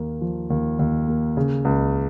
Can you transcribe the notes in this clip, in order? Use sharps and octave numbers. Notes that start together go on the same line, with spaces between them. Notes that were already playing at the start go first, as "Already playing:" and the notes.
Already playing: D#2 A#3
F3
D#2
D#2
A#3
C#3
C#2